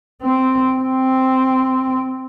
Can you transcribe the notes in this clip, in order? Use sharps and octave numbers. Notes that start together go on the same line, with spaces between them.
C4
C4